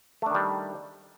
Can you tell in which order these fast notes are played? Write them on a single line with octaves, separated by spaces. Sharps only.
A3 D4 D#3 G3